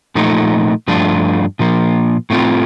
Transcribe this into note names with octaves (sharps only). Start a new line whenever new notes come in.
A#2 F3 A3 D#4
G2 F3 A3 D4 F4
A#2 F3 A#3
A2 A3 C4 F4